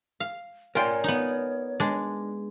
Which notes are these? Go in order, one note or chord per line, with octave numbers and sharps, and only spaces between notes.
F5
C#4 F4 A#4 C#5 D5 G5 G#5
B3 D#4
G#3 D4